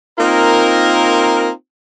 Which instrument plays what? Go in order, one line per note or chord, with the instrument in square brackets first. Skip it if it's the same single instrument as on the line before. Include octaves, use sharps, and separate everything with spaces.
[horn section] A#3 C4 D#4 F4 A#4